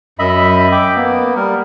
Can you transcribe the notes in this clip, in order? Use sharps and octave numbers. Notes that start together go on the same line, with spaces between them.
F#2 D#5 E5 B5
G5 D6
A#3 B3
G3 A#4